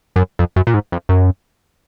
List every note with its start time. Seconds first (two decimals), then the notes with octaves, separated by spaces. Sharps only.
0.16 F#2
0.39 F2
0.56 F#2
0.67 A#2
0.74 G#2
0.92 F2
1.09 F#2